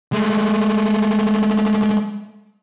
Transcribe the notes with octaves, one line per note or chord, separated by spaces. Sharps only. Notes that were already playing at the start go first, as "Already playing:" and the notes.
G#3 A3